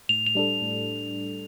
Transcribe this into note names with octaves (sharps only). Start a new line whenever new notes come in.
A2 F7
F7
G3 D4 A4
A2